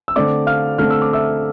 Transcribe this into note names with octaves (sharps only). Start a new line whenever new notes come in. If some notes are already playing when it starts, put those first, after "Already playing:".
E6
D3 A3 C4 D5 D6
F5 F6
D3 A3 C4 F6
E6
D6
E5 E6